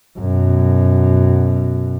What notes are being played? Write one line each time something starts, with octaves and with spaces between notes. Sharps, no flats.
F#2 B2